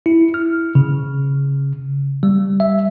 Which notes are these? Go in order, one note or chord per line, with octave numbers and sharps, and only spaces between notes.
E4
F6
C#3
G3
E5